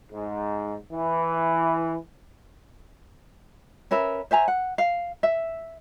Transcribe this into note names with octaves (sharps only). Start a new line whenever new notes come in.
G#2
E3
C#4 A#4 B4 E5
C5 E5 G#5 A#5
F#5
F5
E5